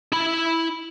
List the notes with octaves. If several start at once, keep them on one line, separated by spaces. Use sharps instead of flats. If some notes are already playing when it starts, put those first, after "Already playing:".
E4 B5